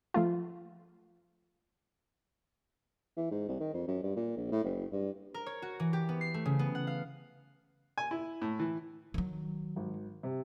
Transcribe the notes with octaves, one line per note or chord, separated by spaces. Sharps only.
F3 A3 F4
E3
G#2
C2
D#3
F2
F#2
G2
A#2
A#1
A2
F#1
G2
A#4
C#5
F#4
E3
G4
B3
C7
A3
C#3
B3
F#5
F5
G#5
E4
A2
E3
D#3 F#3
G#1
C3